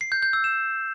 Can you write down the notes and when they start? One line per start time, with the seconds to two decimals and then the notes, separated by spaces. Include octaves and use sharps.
0.01 C7
0.12 G6
0.22 G6
0.33 E6
0.44 E7